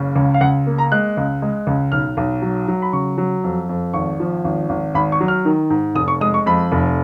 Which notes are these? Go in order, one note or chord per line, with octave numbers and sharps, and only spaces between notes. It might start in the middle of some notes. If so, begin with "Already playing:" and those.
Already playing: F#1 C#3
C#2
F5
C#2 F#5
A#3
A#5
G#3 F#6
C#2
G#3
C#2
B1 F6
B1
F#3
F#3
B5
C#3 C#6
F#3
F2
F2
G#1 C#6
F3
G#1
G#1
G#1 B5
C#6
F#3
F6
D#3
G#2
F1 D#6
C#6
G#3 D#6
C#6
F2 B5
F1